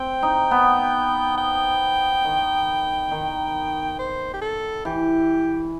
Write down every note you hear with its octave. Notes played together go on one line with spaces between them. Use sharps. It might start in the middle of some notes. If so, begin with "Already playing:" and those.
Already playing: C4 G5
D#4
B3
G5
D#3
D#3
C5
G4
A4
E3 G4